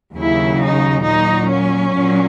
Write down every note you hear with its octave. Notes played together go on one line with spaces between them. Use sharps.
D#2 C#3 F#3 E4
D#4
A#2 F#3 D#4
C#4
A#2 F#3